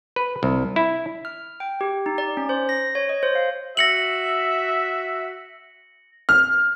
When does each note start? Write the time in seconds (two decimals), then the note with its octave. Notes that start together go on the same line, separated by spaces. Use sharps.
0.16 B4
0.43 C2
0.76 E4
1.25 F6
1.60 G5
1.81 G4
2.06 D#4
2.18 D5
2.37 C#4
2.49 C5
2.69 A#6
2.95 C#5
3.09 D#5
3.23 C5
3.35 F5
3.77 F#4 E5 A#6 C#7 F#7
6.29 F6